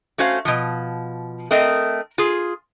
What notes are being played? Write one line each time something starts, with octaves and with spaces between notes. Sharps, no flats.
A3 C#4 F#4 C5 F5
B2 F3
A3 C4 A#4 D#5
F4 G#4